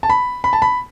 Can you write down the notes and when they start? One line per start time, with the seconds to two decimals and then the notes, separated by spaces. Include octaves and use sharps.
0.03 A5
0.10 B5
0.44 B5
0.53 A5
0.62 B5